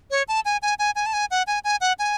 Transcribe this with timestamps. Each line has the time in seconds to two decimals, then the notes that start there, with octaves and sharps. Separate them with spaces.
0.11 C#5
0.28 A5
0.45 G#5
0.62 G#5
0.79 G#5
0.96 G#5
1.06 A5
1.13 G#5
1.31 F#5
1.47 G#5
1.64 G#5
1.81 F#5
1.99 G#5